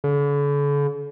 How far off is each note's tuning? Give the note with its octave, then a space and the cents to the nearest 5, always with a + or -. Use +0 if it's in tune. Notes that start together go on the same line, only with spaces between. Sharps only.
D3 -45